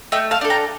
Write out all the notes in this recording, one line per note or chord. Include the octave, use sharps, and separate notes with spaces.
A3 D#5 G5
F5 A5
D4 A4
G5 A#5